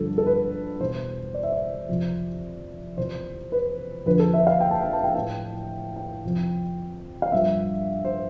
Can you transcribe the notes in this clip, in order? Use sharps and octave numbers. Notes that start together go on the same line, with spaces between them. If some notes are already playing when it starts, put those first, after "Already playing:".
Already playing: G2 D3 F3 A4
A4
B4
E2 B2 C5
D5
E5
D5
F2 C3 F3
E2 C3 F3 C5
B4
F2 D3 F3 B4
A4
E5
F5
G5
A5
G5
A5
G5
A2 E3 G5
G5
F2 C3 F3
F5
G2 F3 E5
C5